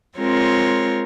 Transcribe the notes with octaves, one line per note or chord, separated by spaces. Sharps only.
G#3 C4 F4 A#4 C#5